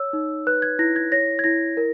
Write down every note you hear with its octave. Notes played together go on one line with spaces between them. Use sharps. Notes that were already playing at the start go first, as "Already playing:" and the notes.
Already playing: C#5 E6
D#4
B4 F#6
G#6
E4 A#6
G#6
C#5 A#6
G#6
E4 A#6
A#4